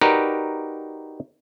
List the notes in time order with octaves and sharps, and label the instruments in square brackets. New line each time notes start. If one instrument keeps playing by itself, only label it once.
[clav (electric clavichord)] D#4 F#4 G4 A#4 B4 D5